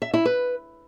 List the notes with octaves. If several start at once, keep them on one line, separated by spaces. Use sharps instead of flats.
E5
E4
B4